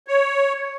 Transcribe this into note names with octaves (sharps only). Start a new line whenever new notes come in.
C#5